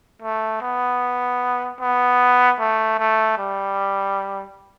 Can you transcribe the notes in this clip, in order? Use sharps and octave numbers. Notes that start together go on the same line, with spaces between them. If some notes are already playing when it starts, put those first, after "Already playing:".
A3
B3
B3
A3
A3
G3